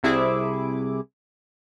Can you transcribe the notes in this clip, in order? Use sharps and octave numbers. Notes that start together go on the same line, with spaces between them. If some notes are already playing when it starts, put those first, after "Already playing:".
C2 C3 E4 G#4 D6